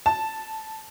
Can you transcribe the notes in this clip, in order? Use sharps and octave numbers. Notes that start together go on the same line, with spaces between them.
A5